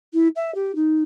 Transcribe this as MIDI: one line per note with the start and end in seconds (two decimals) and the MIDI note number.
0.13 0.28 64
0.35 0.54 76
0.54 0.74 67
0.75 1.03 63